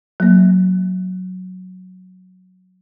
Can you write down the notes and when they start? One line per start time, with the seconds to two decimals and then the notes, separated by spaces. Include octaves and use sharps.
0.20 F#3 A#3